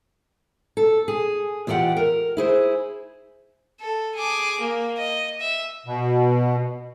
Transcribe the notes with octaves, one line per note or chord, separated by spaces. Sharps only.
A4
G#4
E2 F4 G4 D5 F#5 G5
A#4
E4 G#4 C5
A4
G#4 D6
A#3
D#5
E5
B2